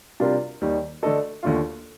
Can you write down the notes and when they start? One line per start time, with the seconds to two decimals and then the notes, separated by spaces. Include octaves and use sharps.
0.20 C3 G3 D4 F4 A#4
0.61 D#2 D#3 G3
1.03 D3 A3 D4 A4 D#5
1.43 D#2 D3 A3 D4 F4